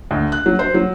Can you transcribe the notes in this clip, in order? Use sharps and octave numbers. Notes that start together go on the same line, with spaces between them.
D2
F#6
F#3
C5
F#3